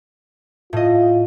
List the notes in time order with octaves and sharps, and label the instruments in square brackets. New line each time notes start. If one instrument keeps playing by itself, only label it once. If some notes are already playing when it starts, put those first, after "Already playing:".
[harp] A2 D#5 [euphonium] F4